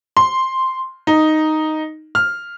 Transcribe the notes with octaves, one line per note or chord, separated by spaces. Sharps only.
C6
D#4
F6